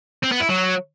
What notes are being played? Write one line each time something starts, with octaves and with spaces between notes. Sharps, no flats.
C4
B3
E4
F#3